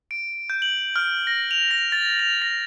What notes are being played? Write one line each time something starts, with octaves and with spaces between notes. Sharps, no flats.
D7
G6
F#7
F6
A#6
F7
A#6
A6
F7
A#6